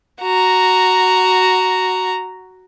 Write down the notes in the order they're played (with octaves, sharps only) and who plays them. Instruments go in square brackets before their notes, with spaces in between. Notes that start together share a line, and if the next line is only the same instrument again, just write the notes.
[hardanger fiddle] F#4 A#5